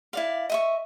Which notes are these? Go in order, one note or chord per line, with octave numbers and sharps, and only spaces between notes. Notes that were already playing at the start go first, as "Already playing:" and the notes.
E4 D5 F5
D#5 E5 C#6